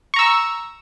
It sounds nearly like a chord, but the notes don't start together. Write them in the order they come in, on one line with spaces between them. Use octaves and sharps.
C#6 A#5 E6